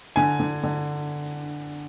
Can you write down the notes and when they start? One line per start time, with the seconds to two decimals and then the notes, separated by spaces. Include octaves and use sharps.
0.16 D3 G#5
0.40 D3
0.63 D3